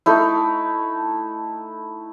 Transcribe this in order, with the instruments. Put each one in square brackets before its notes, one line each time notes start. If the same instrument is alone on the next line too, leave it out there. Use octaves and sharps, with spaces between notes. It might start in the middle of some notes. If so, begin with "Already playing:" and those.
[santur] A3 D#4 E4